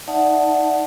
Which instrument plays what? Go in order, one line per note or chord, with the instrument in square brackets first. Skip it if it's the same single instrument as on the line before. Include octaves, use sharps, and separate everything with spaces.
[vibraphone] D#4 D5 E5 F#5 A5